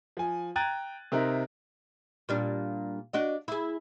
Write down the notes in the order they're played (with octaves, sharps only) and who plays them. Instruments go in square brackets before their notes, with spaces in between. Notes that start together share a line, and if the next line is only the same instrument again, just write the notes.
[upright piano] F3 G#5
G5 A#5 F#6 G#6 A6 D#7
C3 C4 D#4 A#4 E5 F#6
[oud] A#2 G3 D4
D4 F#4 D#5
E4 G#4